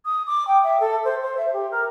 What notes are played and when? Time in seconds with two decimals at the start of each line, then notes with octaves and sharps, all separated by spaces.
0.05 D#6
0.27 D6
0.47 G5
0.63 E5
0.80 A4
1.04 C5
1.22 C5
1.37 E5
1.53 G4
1.71 A#4